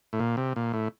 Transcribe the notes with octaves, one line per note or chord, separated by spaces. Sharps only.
A2
A#2
C3
A#2
A2